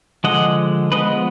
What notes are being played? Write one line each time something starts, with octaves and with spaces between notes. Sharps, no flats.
D3 F3 G#3 D#5 F#5
F3 G#3 B3 B4 D#5